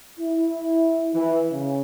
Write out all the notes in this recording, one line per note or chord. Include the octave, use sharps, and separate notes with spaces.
E4
E3
C#3